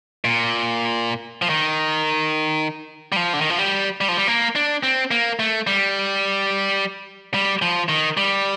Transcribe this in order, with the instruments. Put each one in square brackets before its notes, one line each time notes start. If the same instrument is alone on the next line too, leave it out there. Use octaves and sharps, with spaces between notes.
[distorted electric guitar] A#2
F3
D#3
G3
F3
D3
D#3
F3
G3
G3
F3
G3
A#3
D4
C4
A#3
A3
G3
G3
F3
D#3
G3